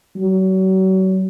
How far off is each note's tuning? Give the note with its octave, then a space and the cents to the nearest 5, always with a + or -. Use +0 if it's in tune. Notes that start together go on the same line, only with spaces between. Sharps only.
F#3 +35